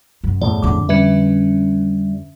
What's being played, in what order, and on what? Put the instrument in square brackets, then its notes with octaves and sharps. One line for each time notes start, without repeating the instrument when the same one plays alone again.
[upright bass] F#2
[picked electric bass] E2 A2 [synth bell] D5
[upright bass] F2 D3 [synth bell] D6
[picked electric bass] G3 [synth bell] C#4 B4 E5